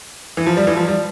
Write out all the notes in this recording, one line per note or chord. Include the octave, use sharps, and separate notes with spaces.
E3
F3
G3
E3
F3
G3